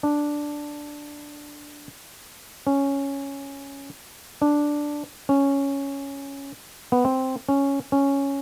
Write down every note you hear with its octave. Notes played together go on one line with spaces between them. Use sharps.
D4
C#4
D4
C#4
B3
C4
C#4
C#4